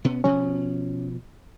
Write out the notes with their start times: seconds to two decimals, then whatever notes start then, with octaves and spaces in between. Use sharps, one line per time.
0.04 B2 B3 C#4
0.24 B2 F3 C#4